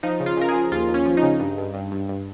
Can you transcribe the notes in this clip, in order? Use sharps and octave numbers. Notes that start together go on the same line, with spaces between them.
F3 D#4
C#3
F4
C#3 A#4
G#4
F3
D#2 F4
D#2
C#4
F3
D#4
C#3
G2
G2
G2
G2
G2